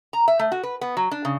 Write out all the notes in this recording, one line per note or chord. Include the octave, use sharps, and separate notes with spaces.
A#5
E5
A3
F#4
B4
B3
F#3
D4
C#3